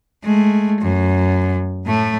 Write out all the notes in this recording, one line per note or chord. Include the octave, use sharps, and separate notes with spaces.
G#3 A3
F#2
A2 A3